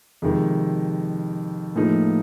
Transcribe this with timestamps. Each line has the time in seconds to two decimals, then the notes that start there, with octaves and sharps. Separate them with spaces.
0.22 F2 C3 D#3 G#3
1.75 A2 F3 A#3 D#4 G#4